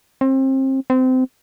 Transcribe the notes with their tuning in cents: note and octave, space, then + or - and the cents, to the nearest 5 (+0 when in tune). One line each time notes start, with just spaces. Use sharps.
C4 +30
C4 -25